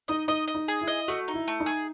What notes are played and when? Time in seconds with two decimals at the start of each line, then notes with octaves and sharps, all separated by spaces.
0.08 D#4 D#5
0.28 D#4 D#5
0.48 D#5
0.55 D#4
0.68 G#4
0.81 E4
0.87 D#5
1.08 A3 F#4
1.28 D#4
1.34 E4
1.48 A3
1.60 D#4
1.66 G#4